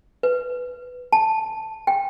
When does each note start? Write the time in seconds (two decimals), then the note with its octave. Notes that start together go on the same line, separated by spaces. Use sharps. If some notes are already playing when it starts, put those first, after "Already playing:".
0.23 B4
1.13 A5
1.87 G5